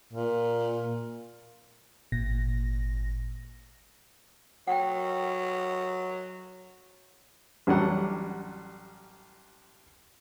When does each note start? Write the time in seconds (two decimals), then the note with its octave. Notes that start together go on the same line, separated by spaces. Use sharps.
0.13 A#2
2.12 G#1 A#2 A#6
4.67 F#3 F#5 G5
7.67 A1 F#3 G3 F#5